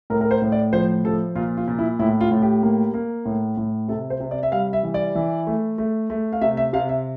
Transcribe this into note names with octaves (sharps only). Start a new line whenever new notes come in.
A2 A#4
A#4
C5
A2
D5
F3 C5
F3 A4
A#2 F4
F4
A#2
E4
A2 E4
F4
A2
G4
A#3
A#3
A2
A2
C3 A4
C5
C3
D5
E5
G3 F5
E5
E3
D5
E3
A3
A3
A3
F5
C3 E5
E5
C3 F5
E5